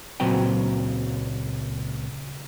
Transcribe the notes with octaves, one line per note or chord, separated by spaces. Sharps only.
C#2 A#2 F#3 C4 B4 G5